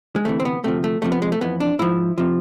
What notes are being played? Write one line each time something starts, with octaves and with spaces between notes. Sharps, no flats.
G#3
D2 C3 E3 A3
C4
B3
D2 C3 F3 A3
A3
F2 C3 F3 A3
B3
G#3
A3
F2 E3 B3
D4
G#2 F3 E4
C3 F3